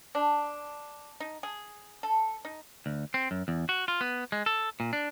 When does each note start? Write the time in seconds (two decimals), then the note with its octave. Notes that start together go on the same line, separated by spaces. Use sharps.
0.15 D4
1.20 D#4
1.43 G#4
2.03 A4
2.45 D#4
2.86 D2
3.14 C4
3.31 F#2
3.48 E2
3.69 F#4
3.88 F4
4.01 B3
4.32 G#3
4.46 A4
4.80 A#2
4.93 D4